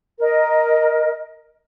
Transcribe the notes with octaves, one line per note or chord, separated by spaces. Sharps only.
A#4 D#5